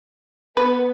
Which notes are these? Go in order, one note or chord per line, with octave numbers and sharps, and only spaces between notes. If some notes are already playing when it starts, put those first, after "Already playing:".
B3 B4